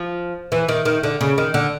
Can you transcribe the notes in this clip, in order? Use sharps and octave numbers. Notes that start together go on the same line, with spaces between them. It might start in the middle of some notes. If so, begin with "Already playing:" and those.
Already playing: F3
E3
D#3
D#3
D3
C#3
D#3
D3